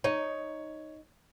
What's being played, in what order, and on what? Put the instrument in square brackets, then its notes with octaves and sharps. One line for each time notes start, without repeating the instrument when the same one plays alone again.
[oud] D#4 [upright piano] C#5